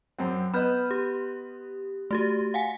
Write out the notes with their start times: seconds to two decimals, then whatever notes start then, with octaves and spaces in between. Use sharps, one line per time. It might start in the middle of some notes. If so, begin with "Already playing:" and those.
0.19 F#2 C4
0.54 B3 B4 D#5 B5 F6 G6
0.91 G4
2.11 A3 F#4 G4
2.54 F5 F#5 G#5